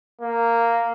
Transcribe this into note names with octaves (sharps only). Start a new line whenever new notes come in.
A#3